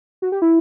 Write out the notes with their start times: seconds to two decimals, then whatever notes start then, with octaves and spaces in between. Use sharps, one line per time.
0.22 F#4
0.32 G4
0.42 E4